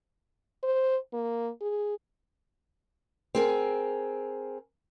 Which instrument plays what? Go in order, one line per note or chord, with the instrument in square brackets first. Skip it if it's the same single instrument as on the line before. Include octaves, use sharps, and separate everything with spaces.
[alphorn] C5
A#3
G#4
[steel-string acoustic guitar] C4 G#4 A#4